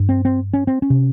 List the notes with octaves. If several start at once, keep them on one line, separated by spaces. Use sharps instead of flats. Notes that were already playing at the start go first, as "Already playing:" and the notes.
Already playing: G2
C4
C4
C#4
C4
C#4
C3